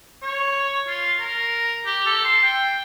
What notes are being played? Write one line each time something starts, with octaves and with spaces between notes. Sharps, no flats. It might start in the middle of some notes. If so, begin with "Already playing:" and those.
C#5
F4
A#4
G4
A4
C6
G5